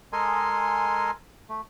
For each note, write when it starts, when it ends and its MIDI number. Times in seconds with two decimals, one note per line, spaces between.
0.13 1.11 56
0.13 1.11 69
0.13 1.11 70
0.13 1.11 75
0.13 1.11 80
0.13 1.11 84
1.49 1.61 57